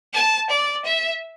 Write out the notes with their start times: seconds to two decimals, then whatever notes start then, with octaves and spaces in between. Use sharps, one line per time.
0.13 A5
0.50 D5
0.85 E5